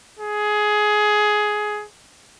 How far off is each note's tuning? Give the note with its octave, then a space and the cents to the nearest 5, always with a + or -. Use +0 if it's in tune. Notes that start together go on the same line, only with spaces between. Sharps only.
G#4 +15